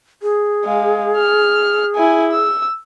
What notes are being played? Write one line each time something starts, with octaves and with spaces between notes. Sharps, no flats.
G#4
G#3 F5
F6
E4 G#5
E6